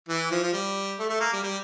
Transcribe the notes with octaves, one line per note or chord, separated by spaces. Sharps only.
E3
F3
F3
G3
A3
A3
A#3
G3
G3